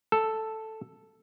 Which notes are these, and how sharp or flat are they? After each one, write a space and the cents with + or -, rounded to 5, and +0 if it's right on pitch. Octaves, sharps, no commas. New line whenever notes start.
A4 +0